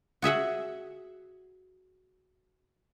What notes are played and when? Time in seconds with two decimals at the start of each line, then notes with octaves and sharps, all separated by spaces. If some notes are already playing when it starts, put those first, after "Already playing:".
0.22 F#4 G#4 E5 F#5